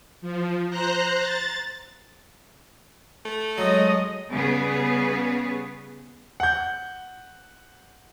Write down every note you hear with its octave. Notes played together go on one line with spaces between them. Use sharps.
F3
C5 A#5 F#6
A6
A3
F#3 G#3 D#5
C#3 G3 B3 G#4 B4
F#5 G6